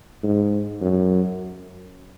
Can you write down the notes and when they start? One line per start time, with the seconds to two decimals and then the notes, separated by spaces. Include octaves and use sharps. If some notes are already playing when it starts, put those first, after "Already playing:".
0.23 G#2
0.81 F#2